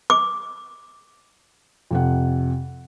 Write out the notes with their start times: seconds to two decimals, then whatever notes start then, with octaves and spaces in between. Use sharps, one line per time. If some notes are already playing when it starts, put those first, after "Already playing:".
0.10 D6
1.91 F2 C3 F#5